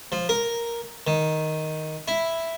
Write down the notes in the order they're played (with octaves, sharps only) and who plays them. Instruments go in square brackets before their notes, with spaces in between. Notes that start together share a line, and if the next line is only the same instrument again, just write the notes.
[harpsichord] F3
A#4
D#3
E4